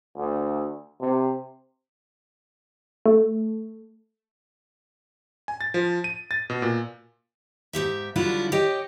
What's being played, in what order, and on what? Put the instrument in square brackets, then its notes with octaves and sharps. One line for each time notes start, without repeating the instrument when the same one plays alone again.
[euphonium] D2
C3
[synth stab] A3
[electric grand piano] G#5
A6
F3
D#7
A6
B2
A#2
[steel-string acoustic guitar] G#2 D#3 G4 E5
D3 F#3 G3 D4 E4 F4
G4 C#5 D#5 G5